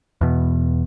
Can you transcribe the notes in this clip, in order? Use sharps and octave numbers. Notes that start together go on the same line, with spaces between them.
E2 B2